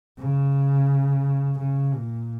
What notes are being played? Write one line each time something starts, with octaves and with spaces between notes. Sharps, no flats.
C#3
C#3
A#2